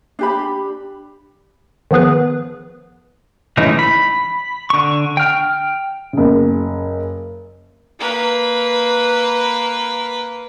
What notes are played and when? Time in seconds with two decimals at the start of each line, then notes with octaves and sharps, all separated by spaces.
0.19 D4 G4 B5
1.91 D#3 F3 B3 G#4 B4
3.57 E3 G#3 A3 C#4 D#4
3.79 B5
4.70 D3 C#6
5.17 G5 F6
6.13 F#1 C#3
8.00 A#3 B4